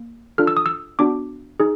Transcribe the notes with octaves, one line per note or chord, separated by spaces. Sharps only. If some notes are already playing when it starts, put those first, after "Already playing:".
Already playing: A#3
D4 F4 A4 F6
E6
D#6
E6
B3 D4 F#4 D6
D#4 G#4